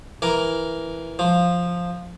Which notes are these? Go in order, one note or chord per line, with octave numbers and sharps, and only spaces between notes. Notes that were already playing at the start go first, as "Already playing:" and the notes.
E3 A#4
F3